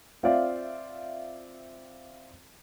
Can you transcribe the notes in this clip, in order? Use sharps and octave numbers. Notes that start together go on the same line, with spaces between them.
C4 F4 C5 D5 E5 F5